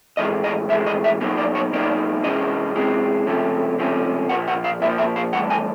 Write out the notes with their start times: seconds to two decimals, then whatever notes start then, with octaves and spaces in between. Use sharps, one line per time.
0.17 A2 E3 G#3 D#5
0.44 D#5
0.69 A2 E3 G#3 E5
0.86 D#5
1.04 E5
1.21 B2 F#3 A#3 D#4
1.38 D5
1.55 C#5
1.73 B2 F#3 A#3 D#4 D5
2.24 C3 E3 G#3 C#4 D#5
2.75 C3 E3 G#3 C#4
3.27 C#2 C3 F3 A3 C#4
3.78 C#2 C3 F3 A3 C#4
4.29 A#2 F3 A#3 F#5
4.48 F#5
4.64 F5
4.82 A#2 F3 A#3 E5
4.98 E5
5.16 F5
5.33 G2 E3 A3 F#5
5.50 G#5